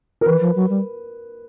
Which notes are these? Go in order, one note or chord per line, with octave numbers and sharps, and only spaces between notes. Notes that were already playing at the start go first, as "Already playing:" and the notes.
A#4
E3 B4
F3
F#3
G3